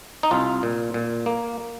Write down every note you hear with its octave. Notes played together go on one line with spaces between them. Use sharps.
D#4
C2 F4
A#2
A#2
A#3